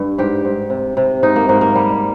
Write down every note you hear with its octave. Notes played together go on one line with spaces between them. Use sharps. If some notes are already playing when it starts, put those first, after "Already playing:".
Already playing: G2
G#2 G4
G#2
C3
C3
G#2 D#4
A#3
G#2 A#3
A#3
G3